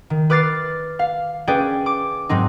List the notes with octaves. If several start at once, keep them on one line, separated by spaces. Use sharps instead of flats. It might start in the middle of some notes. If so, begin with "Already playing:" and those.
D#3
B4 D6 F6 A6 C7
F5
C#4 G#4 B4 D5 G5
D6
G#2 F#3 C4 D#4